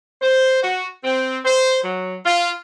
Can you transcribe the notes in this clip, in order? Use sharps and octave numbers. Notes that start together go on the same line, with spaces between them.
C5
F#4
C4
C5
F#3
F4